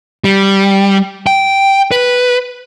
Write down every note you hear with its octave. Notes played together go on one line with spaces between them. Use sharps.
G3
G5
B4